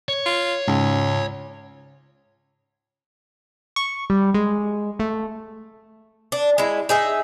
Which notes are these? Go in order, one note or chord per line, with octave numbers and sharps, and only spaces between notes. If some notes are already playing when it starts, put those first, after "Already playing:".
C#5
F4
C#2 G#2 C#3
C#6
G3
G#3
A3
D4
G#3 E4
D#4 G#4 E5